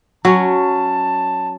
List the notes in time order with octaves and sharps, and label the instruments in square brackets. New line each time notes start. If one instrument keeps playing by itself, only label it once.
[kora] F#3 C#4 [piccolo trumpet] A5